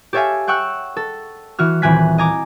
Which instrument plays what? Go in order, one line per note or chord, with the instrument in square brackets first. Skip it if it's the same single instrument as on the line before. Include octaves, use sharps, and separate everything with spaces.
[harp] G4 A4 C#5 E5 F5 G#5
F#5 G5 C#6 E6 F#6
A4
E3 F#4 F6
D#1 E3 C4 G#5 F#6 B6
D#5 G#5 A#5 D6